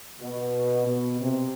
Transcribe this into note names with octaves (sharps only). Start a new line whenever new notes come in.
B2
B2
C3